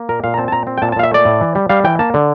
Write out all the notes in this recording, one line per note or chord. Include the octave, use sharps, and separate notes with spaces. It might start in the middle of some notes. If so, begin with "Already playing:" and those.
Already playing: A#3
A#2 A#4
A#2 F5
A#5
C4 A5
A5
A#2 A#5
C4
G5
A#2 A5
A5
A#2 F5
E5
A3 D5
A2
E3
G3
G3 F5
E3 G5
A#3 A5
D3